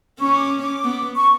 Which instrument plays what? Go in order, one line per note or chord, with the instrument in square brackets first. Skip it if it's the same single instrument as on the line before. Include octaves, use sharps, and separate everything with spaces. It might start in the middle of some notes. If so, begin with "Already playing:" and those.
[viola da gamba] C#4 [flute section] C#6
[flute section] D6
D6
[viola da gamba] B3
[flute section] C#6